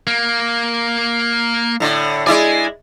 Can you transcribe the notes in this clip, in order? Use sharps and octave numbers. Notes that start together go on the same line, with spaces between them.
A#3
A2 D3
G#3 E4 D5 G#5